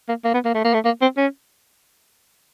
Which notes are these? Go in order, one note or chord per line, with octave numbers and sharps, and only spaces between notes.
A#3
A#3
B3
A#3
A3
A#3
A3
A#3
C4
C#4